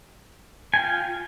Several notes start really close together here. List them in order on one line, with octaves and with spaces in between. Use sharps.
G#5 G5 F4